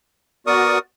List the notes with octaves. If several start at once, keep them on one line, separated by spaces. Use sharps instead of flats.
B3 F#4 A#4 D5 C#6 D#6